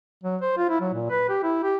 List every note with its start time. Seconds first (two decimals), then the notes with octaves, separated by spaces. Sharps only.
0.23 F#3
0.41 C5
0.57 F4
0.69 E4
0.81 F#3
0.93 A#2
1.10 B4
1.29 G4
1.43 E4
1.63 G4